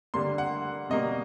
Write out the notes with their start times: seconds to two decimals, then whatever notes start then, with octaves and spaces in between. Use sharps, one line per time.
0.14 D3 G3 A#3 C6
0.38 F#5
0.90 B2 G3 A#3 D#5